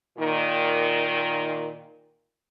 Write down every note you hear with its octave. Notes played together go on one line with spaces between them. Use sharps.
A#2 D#3